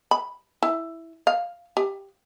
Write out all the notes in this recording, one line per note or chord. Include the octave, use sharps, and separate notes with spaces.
B5
E4
F5
G4